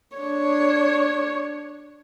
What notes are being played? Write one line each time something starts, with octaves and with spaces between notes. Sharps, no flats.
D4 C#5